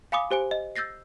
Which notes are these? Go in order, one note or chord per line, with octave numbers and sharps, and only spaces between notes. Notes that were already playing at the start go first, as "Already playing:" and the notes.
F5 G#5 B5 D6 D#6
G4 C5 G#5 D7
D#5
E6 G6 A6 A#6 C7